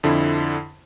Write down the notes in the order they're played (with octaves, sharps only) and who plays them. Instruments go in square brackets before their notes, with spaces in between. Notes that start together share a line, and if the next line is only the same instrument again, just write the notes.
[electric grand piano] F2 D3 E4